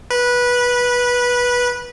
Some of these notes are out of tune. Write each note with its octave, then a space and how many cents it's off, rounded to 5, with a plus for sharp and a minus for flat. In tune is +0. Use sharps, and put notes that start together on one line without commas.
B4 -15